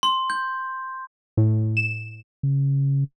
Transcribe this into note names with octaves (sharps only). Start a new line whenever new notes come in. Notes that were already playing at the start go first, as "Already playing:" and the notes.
C6
G6
A2
E7
C#3